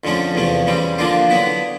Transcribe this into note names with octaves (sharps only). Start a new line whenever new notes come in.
F2 D3 F3 A3 C#4
E2 C3 F3 A3
C#3 E3 G3 C4
D3 F3 A#3 D4 F4
D3 F#3 B3 E4